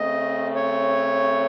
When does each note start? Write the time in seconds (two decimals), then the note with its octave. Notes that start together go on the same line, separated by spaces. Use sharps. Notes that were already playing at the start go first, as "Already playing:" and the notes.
Already playing: C#3 A3 C4 D#5
0.56 C#5